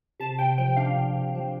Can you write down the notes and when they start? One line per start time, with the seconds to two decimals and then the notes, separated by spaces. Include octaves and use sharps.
0.20 C3 A5
0.39 C3 G5
0.58 F3 G5
0.76 D4 F5
0.96 C3
1.15 C3
1.35 F3